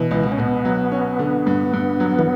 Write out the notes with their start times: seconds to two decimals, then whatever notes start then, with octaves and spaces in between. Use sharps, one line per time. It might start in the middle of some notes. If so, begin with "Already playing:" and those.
Already playing: B2 E3
0.11 C#2
0.24 B3
0.32 C#4
0.38 B2 B3
0.65 F#3
0.92 C#4
1.19 D3
1.46 G2
1.73 G2
2.00 F#3
2.19 E3